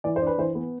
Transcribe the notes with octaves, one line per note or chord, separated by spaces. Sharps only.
E3 D5
C5
D4
B4
E3 C5
B3